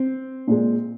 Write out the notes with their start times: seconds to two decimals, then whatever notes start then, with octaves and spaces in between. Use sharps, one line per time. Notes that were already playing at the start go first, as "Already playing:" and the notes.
Already playing: C4
0.48 A#2 G#3